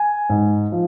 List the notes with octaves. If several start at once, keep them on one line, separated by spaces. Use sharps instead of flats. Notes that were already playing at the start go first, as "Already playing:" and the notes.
Already playing: G#5
G#2
F3